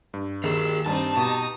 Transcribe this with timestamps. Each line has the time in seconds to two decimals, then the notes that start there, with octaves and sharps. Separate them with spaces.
0.14 G2
0.44 D#2 G#4 A#4 E6
0.86 G2 G3 C4 D#4 A5
1.17 B2 D#4 F#4 G4 D#6